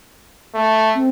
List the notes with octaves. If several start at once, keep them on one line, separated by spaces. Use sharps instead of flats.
A3
C4